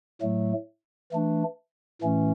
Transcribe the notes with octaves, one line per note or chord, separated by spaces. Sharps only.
A2 F#3 A3
E3 A3 D4
A2 E3 A3 C#4